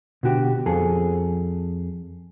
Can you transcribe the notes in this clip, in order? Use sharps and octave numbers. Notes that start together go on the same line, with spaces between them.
B2 D3 F#4 G4
F2 G#4 A4